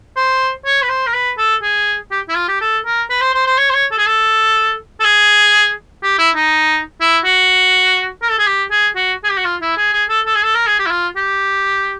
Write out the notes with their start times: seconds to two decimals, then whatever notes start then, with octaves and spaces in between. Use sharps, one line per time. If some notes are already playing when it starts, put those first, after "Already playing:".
0.17 C5
0.65 C#5
0.83 B4
0.89 C5
1.06 A#4
1.14 B4
1.38 A4
1.62 G#4
2.11 G4
2.29 E4
2.36 F4
2.48 G4
2.61 A4
2.85 A#4
3.10 B4
3.21 C5
3.34 C5
3.47 C5
3.58 C#5
3.70 C5
3.74 C#5
3.91 A4
3.98 G#4
4.06 A4
5.00 A4
5.04 G#4
6.03 G4
6.19 E4
6.35 D#4
7.01 E4
7.24 F#4
8.22 A#4
8.30 A4
8.38 G#4
8.47 G4
8.71 G#4
8.96 F#4
9.24 G#4
9.30 G4
9.37 F#4
9.45 F4
9.61 E4
9.77 G#4
9.93 G#4
10.09 A4
10.26 A4
10.35 G#4
10.43 A4
10.55 A#4
10.67 G#4
10.79 G4
10.86 E4
10.91 F4
11.16 G4